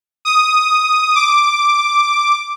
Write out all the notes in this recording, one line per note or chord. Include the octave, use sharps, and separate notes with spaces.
D#6
D6